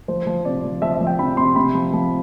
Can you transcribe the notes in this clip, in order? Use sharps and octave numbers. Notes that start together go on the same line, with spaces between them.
F3 C5
F3
C3 D5
F3
F3 E5
E5
F3
G5
C3 B5
C3 C6
C3 B5
F3
F3